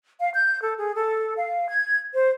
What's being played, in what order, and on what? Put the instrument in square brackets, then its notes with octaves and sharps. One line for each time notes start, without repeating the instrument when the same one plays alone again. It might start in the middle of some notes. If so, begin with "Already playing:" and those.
[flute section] F5
G6
A4
G#4
A4
F5
G#6
C5